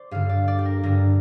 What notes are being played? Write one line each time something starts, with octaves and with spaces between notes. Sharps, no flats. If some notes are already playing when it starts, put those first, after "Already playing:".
Already playing: C5 D5
G2 D3 F5
D5
D5
G4
A#4
G2 D3 A#4